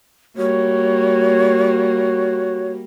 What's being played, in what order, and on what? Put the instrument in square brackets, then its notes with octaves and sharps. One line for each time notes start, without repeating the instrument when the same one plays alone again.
[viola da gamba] G3 A#3 [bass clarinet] F#4 [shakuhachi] C#5